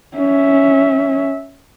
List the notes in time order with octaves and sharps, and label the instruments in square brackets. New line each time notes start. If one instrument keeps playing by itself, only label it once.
[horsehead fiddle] C#4 E5